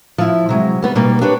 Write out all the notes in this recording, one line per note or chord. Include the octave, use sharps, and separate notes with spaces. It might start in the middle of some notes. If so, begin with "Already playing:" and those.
F3 E4
C3 F#3 G#3
G3 B3 B4
B2 G3 A#3 D#4
D4 G4 B4 C#5